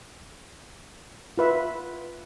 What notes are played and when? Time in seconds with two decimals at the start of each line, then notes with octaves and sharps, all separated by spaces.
1.38 F4 B4 E5